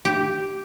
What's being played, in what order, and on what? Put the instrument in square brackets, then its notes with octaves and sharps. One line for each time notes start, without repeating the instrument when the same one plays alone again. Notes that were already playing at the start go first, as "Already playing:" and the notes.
[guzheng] G4